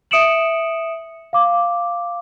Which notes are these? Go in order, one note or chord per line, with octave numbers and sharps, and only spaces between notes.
E5 D#6 C#7 D7 E7 F#7
F5 D6